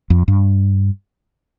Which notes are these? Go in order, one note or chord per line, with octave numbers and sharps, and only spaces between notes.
F2
G2